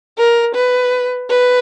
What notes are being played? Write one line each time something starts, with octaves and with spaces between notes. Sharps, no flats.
A#4
B4
B4